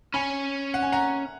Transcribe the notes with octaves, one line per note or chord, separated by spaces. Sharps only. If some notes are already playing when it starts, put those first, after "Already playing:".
C#4 G#5 B5
F#5
G#5
F#5 A#5